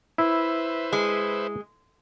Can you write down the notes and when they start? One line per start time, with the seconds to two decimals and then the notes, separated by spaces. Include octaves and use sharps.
0.18 E4 B4 C5 E5
0.92 G#3